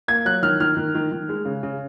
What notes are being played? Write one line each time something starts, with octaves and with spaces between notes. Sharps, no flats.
A#3 G#6
F#3 F#6
D#3 F6
D#3 F6
D#3
D#3
D#3
G#3
C#3
C#3